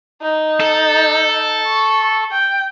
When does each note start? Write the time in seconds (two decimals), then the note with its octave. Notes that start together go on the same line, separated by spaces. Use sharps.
0.22 D#4
0.60 A4
1.67 C#6
2.32 G5